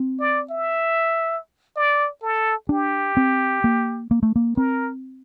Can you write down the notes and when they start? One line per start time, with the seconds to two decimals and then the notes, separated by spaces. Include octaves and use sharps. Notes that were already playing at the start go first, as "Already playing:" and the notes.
Already playing: C4
0.20 D5
0.51 E5
1.76 D5
2.22 A4
2.69 D4 G4
3.17 C4
3.64 A#3
4.11 A#3
4.23 A3
4.36 A#3
4.57 C4 A#4